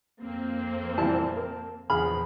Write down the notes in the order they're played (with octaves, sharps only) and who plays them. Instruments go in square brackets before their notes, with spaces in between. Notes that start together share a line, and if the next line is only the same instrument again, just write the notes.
[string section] F2 A#3 C4
[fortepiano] A#2 E3 G3 [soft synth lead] A5
[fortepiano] A#4
[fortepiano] A#1 G#4 F6 [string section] E2 F3 [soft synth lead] B5